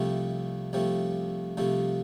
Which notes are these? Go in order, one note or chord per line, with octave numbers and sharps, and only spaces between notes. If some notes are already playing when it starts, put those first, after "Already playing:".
Already playing: C2 C3 F3 A3
C2 C3 F3 A3
C2 C3 F3 A3